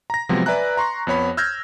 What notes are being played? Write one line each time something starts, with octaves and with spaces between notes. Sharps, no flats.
A#5 A#6
C3 F3 F#3 G#3 B3 C4
B4 D5 E5 G#5 A#5 F#6
A#5 C6 C#6 A#6
F2 B3 C#5 B5
E6 F6 G6 G#6 A#6